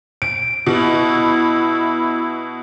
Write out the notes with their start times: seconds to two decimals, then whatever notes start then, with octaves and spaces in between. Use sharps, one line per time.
0.22 D7
0.66 B2 E4